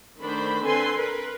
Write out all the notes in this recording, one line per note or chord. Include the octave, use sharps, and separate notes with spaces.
D#3 A3 D4 C5 B5
D3 C4 A4 B4 G#5 C6
A#4 B4